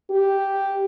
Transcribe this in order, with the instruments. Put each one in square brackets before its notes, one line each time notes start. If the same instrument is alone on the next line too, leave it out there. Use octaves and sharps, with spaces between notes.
[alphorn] G4